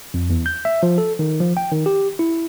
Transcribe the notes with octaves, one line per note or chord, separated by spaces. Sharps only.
F2
E2
G6
E5
F3
A4
D#3
F3
G5
D#3
G4
E4